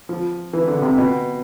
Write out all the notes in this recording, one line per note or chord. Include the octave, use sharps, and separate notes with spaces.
F3
E3
D3
C3
B2